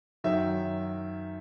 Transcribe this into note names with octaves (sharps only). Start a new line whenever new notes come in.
F#2 D#3 F#3 E5